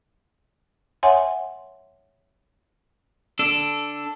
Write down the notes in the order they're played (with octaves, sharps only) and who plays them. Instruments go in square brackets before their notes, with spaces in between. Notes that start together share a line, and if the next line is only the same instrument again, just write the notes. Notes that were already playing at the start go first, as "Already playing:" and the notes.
[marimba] C#5 E5 F#5 G#5 C6
[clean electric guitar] D4 A4